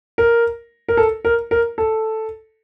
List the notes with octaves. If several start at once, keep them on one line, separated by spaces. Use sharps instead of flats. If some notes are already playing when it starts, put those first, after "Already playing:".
A#4
A#4
A4
A#4
A#4
A4